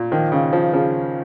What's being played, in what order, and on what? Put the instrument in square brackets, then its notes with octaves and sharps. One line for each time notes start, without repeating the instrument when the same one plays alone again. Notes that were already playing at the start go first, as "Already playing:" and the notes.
Already playing: [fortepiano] A#2
[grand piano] D#3 [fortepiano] F3
[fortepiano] C#3
F3
[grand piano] C#3 [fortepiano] F3